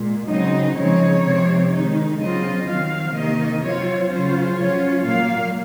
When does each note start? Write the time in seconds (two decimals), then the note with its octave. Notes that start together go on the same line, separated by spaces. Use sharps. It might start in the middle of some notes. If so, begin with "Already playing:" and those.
Already playing: A#2 G#3
0.29 C#3 F#3 C4 D#4 D#5
0.76 C#3 F3 G#3 C4 D#4 C#5
1.24 C3 F3 C4
1.73 D#3 G#3 D#4
2.19 C#3 F#3 C4 F4 D#5
2.67 D#3 F#3 C4 F5
3.14 C3 D#3 A#3 D#4 D#5
3.63 F#3 C4 F4 C#5
4.10 C#3 F#3 C#4 F4 C5
4.57 F#3 C#4 F4 C#5
5.05 A#2 F#3 A#3 F5